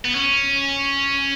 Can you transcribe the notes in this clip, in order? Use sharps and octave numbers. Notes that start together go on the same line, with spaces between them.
B3
C#4